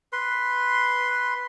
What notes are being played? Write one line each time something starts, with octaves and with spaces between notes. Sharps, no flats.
B4 C6